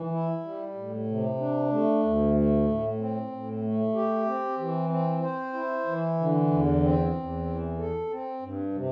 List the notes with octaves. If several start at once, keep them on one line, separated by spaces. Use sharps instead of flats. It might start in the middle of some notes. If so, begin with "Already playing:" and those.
Already playing: E3
E4
G3
A2
C3
D4
A3
D2
A3
A2
C4
A2
A3
G4
C4
E3
C4
C5
E4
E3
D3
E2
C4
E2
E3
A4
C4
G2
C3